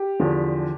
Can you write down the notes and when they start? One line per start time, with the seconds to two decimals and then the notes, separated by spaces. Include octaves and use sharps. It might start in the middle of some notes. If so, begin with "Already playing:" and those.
Already playing: G4
0.20 E2 D3 F3